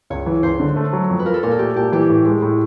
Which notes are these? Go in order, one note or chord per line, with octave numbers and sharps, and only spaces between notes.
C#2 C#5
E3
C#2 C5
D3
A3
F#3
F2
B4
F3 A#4
A4
A#2 A#4
A4
A3 G4
A#2 G4
E3 G4
A2
G#3
A2